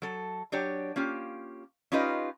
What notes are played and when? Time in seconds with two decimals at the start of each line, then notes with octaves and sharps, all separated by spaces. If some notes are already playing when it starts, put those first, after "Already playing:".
0.02 F#3 A4
0.52 F#3 D4 G4 C#5
0.96 A#3 C#4 F4 G4
1.92 C#4 D#4 F4 G4 B4 D#5